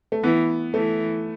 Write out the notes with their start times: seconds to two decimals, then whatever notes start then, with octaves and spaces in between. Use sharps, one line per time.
0.12 A3
0.23 E3 B3
0.74 E3 A3